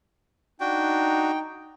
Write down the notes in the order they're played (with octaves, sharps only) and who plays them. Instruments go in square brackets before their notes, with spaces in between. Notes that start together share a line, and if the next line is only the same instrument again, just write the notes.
[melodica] D4 F#4 [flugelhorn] D#4 [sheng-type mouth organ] G5